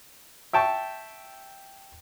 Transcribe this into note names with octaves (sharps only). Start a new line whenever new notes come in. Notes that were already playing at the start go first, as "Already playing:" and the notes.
E5 G5 A5 C#6